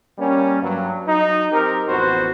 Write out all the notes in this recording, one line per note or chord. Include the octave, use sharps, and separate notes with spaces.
G3 A#3 C#4
G2 F#3
F#3 D#4
C4 D#4 G4 A#4
A1 F2 B3 F#4 C5